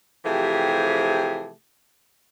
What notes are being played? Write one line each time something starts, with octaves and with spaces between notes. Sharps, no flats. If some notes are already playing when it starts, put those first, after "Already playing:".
C3 E3 F3 A3 G4 G#4